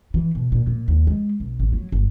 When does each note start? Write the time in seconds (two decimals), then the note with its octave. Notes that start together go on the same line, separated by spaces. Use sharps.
0.14 E3
0.35 B2
0.52 A#2
0.67 A#2
0.88 D#2
1.07 G#3
1.40 B1
1.60 A1
1.72 F#3
1.92 G1